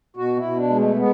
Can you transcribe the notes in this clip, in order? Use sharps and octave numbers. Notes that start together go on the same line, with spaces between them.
B2 F#4
E4
B2
D4
G#3
A3
G#3 B3